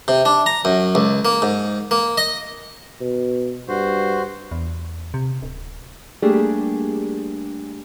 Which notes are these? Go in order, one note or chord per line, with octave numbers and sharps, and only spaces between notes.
C3
D4
A#5
F#2
C#2
A#3
G#2
A#3
D#5
B2
G2 F#4 C5
E2
C3
D1
G3 A3 A#3 D4 G4 G#4